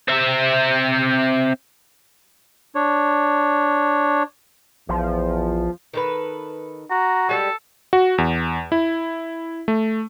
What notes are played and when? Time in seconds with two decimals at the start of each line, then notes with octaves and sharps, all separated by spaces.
0.08 C4 E5
2.75 D4 C#5
4.89 A#1 E2 F3
5.93 D#3 A4 B4
6.90 F#4 A#5
7.29 G3 G#3 A4
7.93 F#4
8.18 E2
8.72 E4
9.68 A3